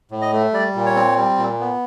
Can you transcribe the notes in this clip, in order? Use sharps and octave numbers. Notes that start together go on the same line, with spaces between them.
A2
D#5
A3
G3 D5
A#2
C#5
C4
G3
A#2
B3